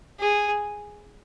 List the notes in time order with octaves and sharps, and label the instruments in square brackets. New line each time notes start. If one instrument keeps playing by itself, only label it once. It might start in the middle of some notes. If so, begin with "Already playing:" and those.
[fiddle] G#4